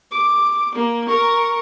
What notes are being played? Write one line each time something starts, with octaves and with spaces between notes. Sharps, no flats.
D6
A#3
A#4 C#6